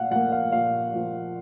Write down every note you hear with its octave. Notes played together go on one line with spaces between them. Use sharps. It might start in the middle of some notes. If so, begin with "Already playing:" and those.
Already playing: A#2 F5 F#5
F3 A#3 F#5
F5
A#2 F5
F3 A#3